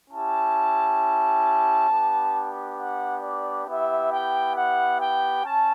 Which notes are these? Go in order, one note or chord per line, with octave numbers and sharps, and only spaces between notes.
C#4 E4 G4 A5
B3 D4 G4
F#5
D5
B3 E4 G4 E5
G5
F#5
G5
C#4 A5